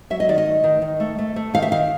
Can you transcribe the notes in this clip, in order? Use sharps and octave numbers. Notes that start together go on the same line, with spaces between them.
F#3 E5
D#5
D#3 D5
D#5
A3
D#3
D#3
A3
A3
A3
D#3 F5
E5
D#3 F5